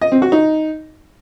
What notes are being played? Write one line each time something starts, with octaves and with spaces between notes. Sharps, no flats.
D#5
C4
F#4
D#4